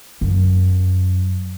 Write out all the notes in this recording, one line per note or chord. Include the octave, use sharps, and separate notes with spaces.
F#2